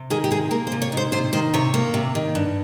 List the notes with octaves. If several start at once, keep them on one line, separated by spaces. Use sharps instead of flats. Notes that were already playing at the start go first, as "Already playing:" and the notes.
Already playing: C3
D#3 G#4
G4
C3 G#4
A#3 A#4
C5
C3
C#5
D#3
C5
C3 C5
D#3 C5
C3 C#5
A#3
C3
D#3
G2